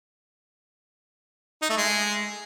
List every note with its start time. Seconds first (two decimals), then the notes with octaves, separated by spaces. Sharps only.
1.62 D#4
1.69 A3
1.77 G#3